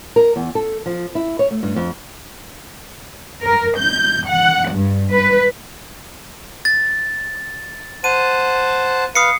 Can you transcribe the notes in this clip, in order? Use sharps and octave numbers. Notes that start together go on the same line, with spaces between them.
A#4
E2
A4
F3
E4
C#5
A3
G2
F2
A#4
G6
F#5
G2
B4
A6
C5 F#5 A5 D#7
B4 F5 D#6 C7 C#7